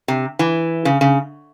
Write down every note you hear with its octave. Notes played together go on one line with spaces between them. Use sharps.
C3
E3
C#3
C#3